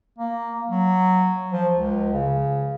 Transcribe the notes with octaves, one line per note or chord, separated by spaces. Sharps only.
A#3
F#3
F3
C#2
C#3